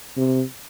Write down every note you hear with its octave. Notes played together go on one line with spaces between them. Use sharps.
C3